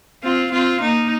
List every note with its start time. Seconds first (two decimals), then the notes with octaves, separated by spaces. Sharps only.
0.23 C4 F4
0.52 C4 F4
0.81 A#3 D#4